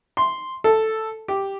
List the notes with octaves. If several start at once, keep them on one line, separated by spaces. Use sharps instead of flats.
C6
A4
G4